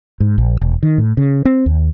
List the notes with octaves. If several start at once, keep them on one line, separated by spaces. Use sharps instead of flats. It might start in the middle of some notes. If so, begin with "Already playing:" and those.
G#2
A#1
E1
D#3
A2
C#3
C4
D#2